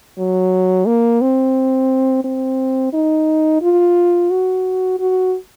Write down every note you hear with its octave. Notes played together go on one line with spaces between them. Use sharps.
F#3
A#3
C4
C4
D#4
F4
F#4
F#4